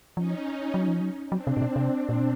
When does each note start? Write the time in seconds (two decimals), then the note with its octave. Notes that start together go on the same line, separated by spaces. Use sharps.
0.16 F3 C#4 D#4
0.74 F#3
0.88 F3
1.01 F#3
1.32 F#3 C4 D4
1.47 C3
1.57 A#2
1.62 B2
1.76 C3
2.09 A#2
2.20 B2